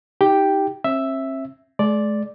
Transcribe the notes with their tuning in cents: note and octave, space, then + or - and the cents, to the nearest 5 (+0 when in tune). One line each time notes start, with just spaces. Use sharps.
D#4 +30 G4 +0 G5 +0
C4 +45 E5 +0
G#3 +45 D5 +0